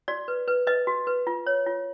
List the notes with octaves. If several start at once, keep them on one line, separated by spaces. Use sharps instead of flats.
F#4 D5
B4
B4
B4 D#5
F#4
B4
F4
C#5
F4